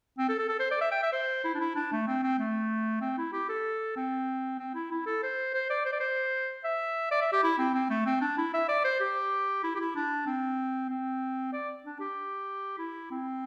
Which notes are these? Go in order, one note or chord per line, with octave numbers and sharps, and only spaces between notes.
C4
A4
A4
A4
C5
D5
E5
G5
E5
C5
E4
D4
E4
D4
A3
C4
C4
A3
C4
E4
G4
A4
C4
C4
E4
E4
A4
C5
C5
D5
C5
D5
C5
E5
D5
E5
G4
E4
C4
C4
A3
C4
D4
E4
E5
D5
C5
G4
E4
G4
E4
D4
C4
C4
D5
D4
G4
E4
C4